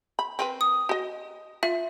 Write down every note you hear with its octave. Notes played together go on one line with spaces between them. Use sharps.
B5
C4 A#4 B4
D#6
F#4 D#5
F4 E5